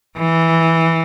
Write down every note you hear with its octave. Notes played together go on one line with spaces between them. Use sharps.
E3